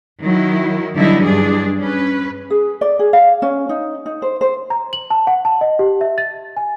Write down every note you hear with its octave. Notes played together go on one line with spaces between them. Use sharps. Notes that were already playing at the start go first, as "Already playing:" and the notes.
D#3 F#3 E4
D3 E3 F#3 G3 D#4 E4
G2 D4 G#4
C#4 B4
G#4
D5
G#4
F5
C#4
D#4
D#4
C5
C5
A#5
F#7
A5
F#5
A5
D#5
G4
E5
A6
G#5